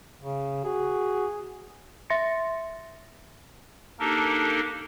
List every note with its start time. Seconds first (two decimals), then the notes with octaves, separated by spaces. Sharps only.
0.20 C#3
0.64 F#4 G#4
2.10 E5 C6 A6 A#6 C#7
4.00 A#3 D4 D#4 G4 A4 A#4